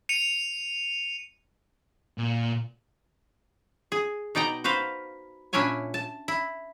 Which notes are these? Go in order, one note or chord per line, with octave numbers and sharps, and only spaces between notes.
C#7 D#7 F7
A#2
G#4
B2 D#4 D5 G5 A#5
F#4 B4 C5 F5
A#2 C#4 D4 E4 C#5 G#5
A5
E4